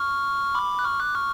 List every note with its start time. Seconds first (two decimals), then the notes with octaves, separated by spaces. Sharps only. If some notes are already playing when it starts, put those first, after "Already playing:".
Already playing: C#6 F6
0.55 B5 D6
0.79 F#6
0.85 C#6 F6
1.00 D6 F#6
1.15 C#6 F6